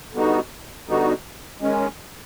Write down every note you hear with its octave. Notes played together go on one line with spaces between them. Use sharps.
D3 G3 B3 D#4 F#4
D3 G3 B3 D#4 F#4
D#3 G#3 C#4